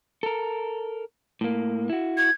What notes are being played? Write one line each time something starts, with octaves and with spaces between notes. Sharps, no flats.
A4 A#4
A2 A#3
E4 F#4
G#6